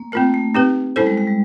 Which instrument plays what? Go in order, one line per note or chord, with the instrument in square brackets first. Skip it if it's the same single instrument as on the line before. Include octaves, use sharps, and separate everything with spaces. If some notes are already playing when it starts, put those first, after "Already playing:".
Already playing: [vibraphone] A#3
[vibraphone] A3 [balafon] C4 F4 A#4
[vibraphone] A3
[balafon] C4 D#4 G4 B4
[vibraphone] G3 [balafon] C#4 E4 A4 C5
[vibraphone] G#3
G#3
G3